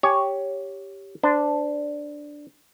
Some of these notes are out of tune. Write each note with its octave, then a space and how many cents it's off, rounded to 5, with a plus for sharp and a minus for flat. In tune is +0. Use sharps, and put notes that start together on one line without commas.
G4 +0 C#5 +5 G#5 +10
D4 +0 C5 -20